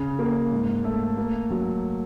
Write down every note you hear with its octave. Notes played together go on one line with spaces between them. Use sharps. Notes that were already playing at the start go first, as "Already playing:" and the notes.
Already playing: C#3
A#3
G#2
A3
A#3
F#3